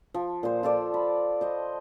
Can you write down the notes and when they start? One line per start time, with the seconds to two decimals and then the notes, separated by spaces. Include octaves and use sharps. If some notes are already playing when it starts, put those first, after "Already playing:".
0.14 F3
0.43 A#2 C5
0.63 F4 A4 D5
0.94 B5
1.41 C5 D#5